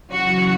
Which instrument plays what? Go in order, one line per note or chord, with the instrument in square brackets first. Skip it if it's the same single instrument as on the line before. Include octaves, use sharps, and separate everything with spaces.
[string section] F#2 C#3 E3 F#4